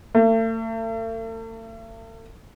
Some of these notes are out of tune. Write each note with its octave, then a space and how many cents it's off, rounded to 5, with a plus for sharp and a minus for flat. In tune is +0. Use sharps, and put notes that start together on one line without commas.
A3 +40